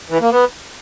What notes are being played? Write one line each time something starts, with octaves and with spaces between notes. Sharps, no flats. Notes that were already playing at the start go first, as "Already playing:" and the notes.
E3
A#3
B3